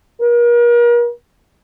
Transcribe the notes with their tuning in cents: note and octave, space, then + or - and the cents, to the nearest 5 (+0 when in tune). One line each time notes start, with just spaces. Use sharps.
A#4 +40